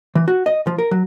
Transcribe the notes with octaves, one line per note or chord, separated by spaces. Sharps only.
E3
F#4
D#5
F3
A#4
F#3